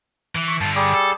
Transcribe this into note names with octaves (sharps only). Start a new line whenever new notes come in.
E3
C#6
G2 D3 A5
G3 G4 G#4
A4